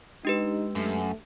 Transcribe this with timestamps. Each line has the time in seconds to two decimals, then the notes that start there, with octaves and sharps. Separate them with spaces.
0.25 G#3 D4 D#4 G4 B4
0.75 F#2 A3